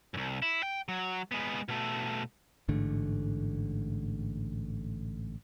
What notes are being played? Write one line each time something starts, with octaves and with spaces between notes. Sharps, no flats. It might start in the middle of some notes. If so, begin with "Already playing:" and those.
C2 F#2
E4
G5
F#3
G#3 B3
B2 A3
A1 G#2 D3 A3